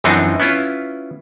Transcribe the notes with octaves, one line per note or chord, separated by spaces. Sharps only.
F#2 E3 F3 C4 D4 D#4
B3 C#4 E4 F4